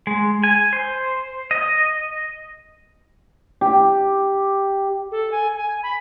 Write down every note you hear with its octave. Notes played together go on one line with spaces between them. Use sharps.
G#3
G#5
C5
D#5
G4
A4
G#5
G#5
B5